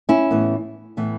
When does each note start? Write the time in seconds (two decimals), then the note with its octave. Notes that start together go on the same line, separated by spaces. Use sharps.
0.09 C#4 E4
0.31 A2 E3 B3
0.97 A2 E3 B3